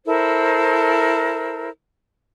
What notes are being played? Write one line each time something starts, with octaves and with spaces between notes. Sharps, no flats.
E4 A4 A#4 C5